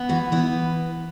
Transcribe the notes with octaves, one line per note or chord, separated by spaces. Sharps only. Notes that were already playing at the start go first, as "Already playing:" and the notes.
Already playing: B3
E3 F#4
B3 E4